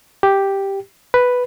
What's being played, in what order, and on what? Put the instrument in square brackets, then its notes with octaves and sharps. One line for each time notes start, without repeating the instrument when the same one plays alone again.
[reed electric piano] G4
B4